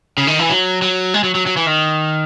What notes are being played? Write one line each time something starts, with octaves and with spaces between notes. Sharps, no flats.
C#3
D#3
E3
F#3
F#3
G#3
F#3
F#3
F#3
E3
D#3